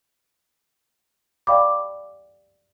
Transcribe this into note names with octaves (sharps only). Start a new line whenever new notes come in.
D5 F5 G5 B5 D6